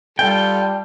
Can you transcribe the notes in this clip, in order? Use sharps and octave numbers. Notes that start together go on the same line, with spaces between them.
G3 F4 A4 G5